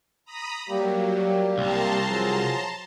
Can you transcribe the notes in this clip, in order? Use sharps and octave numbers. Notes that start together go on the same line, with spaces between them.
A#5 B5 D#6
F#3 G3 A#3 G4
C2 A5 A#5 C6
F3 F#3 G#4